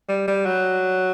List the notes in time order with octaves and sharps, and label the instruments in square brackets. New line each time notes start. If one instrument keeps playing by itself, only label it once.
[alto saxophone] G3
G3
F#3